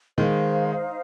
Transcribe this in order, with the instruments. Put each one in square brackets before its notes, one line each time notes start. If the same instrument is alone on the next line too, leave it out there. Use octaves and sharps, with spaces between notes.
[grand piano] D#3 G#3 [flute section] D#4 C5 F5